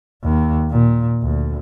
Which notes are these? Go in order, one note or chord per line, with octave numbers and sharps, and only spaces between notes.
D#2
A#2
D2